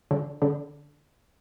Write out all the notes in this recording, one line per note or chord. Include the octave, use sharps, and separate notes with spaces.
D3
D3